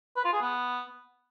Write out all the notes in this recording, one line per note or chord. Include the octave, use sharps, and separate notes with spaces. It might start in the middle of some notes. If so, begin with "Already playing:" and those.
B4
F4
G#4
B3